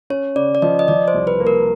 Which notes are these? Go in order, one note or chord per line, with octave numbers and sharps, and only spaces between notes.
C#4 C#5
C#3 D5
D5
F3 D#5
D#5
F3 D5
C5
C2
B4
A#3
A#4